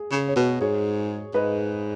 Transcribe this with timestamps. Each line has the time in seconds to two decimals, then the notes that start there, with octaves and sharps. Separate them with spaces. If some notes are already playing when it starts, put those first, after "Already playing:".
Already playing: G#4
0.11 C#3 G#4
0.28 C#5
0.36 B2 F#4 B4
0.61 G#2 G#4 C#5
1.34 G#2 B4 D#5